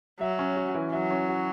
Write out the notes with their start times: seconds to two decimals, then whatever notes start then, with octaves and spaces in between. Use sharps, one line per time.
0.20 F#3 E5
0.39 C#4
0.56 F#4
0.75 E3
0.93 F#3 E5
1.11 C#4
1.29 F#4